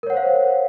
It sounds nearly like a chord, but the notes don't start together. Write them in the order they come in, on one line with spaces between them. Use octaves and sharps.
A#4 C#5 F#5 C5 F5